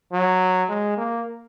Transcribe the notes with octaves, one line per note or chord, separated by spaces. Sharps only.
F#3
G#3
A#3